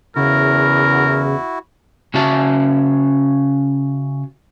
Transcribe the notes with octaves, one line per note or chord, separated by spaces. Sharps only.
E2 C#3 E4 F#4 A#4
C#3 C#4 F#4 E5 A5